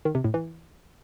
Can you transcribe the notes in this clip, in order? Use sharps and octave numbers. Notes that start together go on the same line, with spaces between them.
D#3
C3
A2
E3